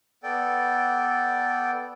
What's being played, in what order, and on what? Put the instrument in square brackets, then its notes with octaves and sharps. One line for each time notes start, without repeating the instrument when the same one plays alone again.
[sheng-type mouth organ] B3 A4 D5 G5